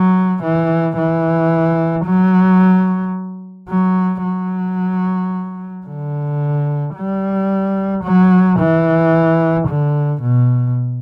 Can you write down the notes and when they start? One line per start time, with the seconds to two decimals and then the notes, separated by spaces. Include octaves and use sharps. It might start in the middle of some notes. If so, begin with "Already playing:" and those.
Already playing: F#3
0.42 E3
0.97 E3
2.06 F#3
3.69 F#3
4.23 F#3
5.87 D3
6.96 G3
8.03 F#3
8.59 E3
9.67 D3
10.21 B2